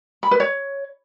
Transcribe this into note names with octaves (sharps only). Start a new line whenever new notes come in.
B5
B4
C#5